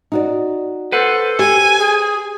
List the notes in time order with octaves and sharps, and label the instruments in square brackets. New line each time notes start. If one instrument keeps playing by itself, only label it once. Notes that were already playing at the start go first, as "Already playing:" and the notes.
[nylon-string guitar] D#4 F#4 D5
[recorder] A4 [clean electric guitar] B4 C5 F#5
[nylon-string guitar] G4 [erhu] G#5
[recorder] G#4